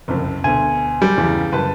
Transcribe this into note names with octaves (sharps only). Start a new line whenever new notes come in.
F#1 C2 F2
D2 B2 G#5
G3
E2 G2 C#3 E3
F#1 B4 A5